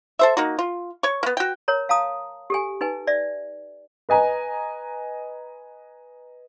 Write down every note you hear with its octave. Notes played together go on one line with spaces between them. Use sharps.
A4 C5 E5
A#3 D#4 F#4
F4
C#5 C#6
A#3 B3
F#4 G5
A#4 C#5 A#5
F5 A5 A#5 D#6
G4 A4 G#5
D#4 B4 G#5
D5 E5
B4 D#5 G#5 A#5